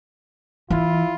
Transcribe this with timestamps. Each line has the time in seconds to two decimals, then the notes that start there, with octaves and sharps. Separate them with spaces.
0.70 E3 E4 F4